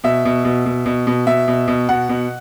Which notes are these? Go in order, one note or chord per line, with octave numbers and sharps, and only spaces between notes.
B2 E5
B2
B2
B2
B2
B2
B2 E5
B2
B2
B2 F#5
B2